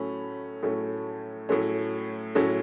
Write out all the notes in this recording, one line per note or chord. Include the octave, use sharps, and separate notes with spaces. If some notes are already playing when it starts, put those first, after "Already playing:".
Already playing: A2 F#3 A3 C#4 B5
A2 F#3 A3 C#4
A2 F#3 A3 C#4
A2 F#3 A3 C#4